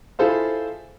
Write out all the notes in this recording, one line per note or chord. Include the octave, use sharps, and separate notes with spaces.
E4 F4 G#4 A4 C5 F5